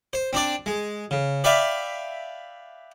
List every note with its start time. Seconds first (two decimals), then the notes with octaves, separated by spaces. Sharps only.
0.13 C5
0.33 C4 D4 D5
0.66 G#3
1.11 C#3
1.44 B4 D5 E5 F5 G5